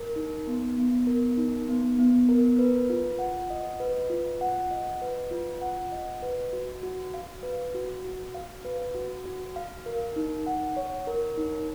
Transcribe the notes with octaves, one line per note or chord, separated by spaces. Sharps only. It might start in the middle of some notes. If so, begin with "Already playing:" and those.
Already playing: A#4
D#4
B3
B3
A#4
D#4
B3
B3
A#4
B4
F4
F#5
D#5
B4
F4
F#5
D#5
B4
F4
F#5
D#5
B4
F#4
F#4
F5
B4
F#4
F#4
F5
B4
F#4
F#4
F5
A#4
D#4
F#5
C#5
A#4
D#4